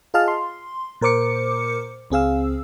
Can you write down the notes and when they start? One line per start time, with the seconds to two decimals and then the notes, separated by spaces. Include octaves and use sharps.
0.14 F4 G#4 D#5 F5 A5 F6
0.28 C6
1.01 A#2 A#4 C5 D6 C#7
2.10 C#2 C4 G#4 F5 E6